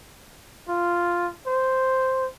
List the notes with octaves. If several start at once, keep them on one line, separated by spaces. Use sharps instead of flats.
F4
C5